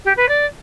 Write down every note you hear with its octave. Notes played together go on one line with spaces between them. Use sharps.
G4
B4
D5